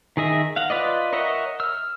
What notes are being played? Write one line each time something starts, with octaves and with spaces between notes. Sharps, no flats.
D#3 G#4 D#5 E5
F5 F#5
F4 B4 D5 D#5
A#4 C#5 D#5 E5 F#5
E6 F6